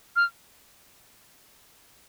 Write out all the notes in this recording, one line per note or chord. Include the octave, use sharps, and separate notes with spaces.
F6